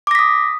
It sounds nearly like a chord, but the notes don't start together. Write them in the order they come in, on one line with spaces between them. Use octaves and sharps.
D6 A#6 B6 D#6